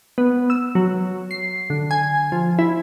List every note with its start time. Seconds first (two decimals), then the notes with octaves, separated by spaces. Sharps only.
0.18 B3
0.50 E6
0.75 F#3
1.31 C7
1.70 D3
1.91 G#5
2.32 F3
2.59 E4